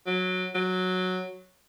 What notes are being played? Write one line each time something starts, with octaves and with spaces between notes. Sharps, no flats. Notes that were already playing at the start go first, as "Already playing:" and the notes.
F#3
F#3